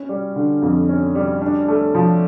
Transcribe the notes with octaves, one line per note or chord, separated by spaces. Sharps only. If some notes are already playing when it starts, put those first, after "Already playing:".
Already playing: C#4
G3
D3
F2
C#4
G3
D4
A3
F3